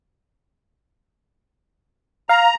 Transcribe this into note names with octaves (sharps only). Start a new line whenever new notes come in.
F5 A#5